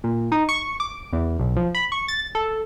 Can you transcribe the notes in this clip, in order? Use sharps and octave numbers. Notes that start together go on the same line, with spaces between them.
A#2
D#4
C#6
D6
E2
B1
F3
B5
C#6
A6
A4